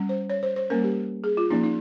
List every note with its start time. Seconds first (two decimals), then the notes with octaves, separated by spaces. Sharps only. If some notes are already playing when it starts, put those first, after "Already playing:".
Already playing: G3 C#4
0.09 C5
0.30 C#5
0.43 C5
0.56 C5
0.70 G3 A#3 C#4 A#4
0.84 G4
1.24 G#4
1.37 F4
1.50 F3 A#3 C#4 D#4
1.64 D#4